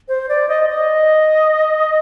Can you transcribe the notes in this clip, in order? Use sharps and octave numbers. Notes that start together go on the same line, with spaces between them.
C5
D5
D#5
D#5